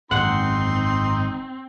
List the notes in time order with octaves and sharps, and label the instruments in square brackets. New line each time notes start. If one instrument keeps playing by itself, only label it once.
[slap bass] G#1 F#2 D3 [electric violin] C4 [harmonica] D#4 C6 [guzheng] F#5